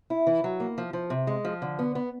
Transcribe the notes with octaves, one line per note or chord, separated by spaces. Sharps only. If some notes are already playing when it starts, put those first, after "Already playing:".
E4
E3
F#3
A#3
F3
F3
C3
G#3
F3
D3
B3
B3